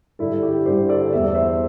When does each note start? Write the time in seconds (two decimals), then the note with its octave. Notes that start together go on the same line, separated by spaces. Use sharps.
0.19 G2 D3 G3 E4 A4
0.43 G4
0.66 G2 D3 G3 G4 C5
0.89 A4 D5
1.12 E2 E3 G3 E5
1.24 D5
1.35 C5 E5